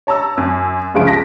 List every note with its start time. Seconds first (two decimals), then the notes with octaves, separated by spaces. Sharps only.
0.07 C#5 A5 A#5 E6
0.38 F#2
0.94 G1 C#2 C#3 F3 D7
1.07 A5 A#6 B6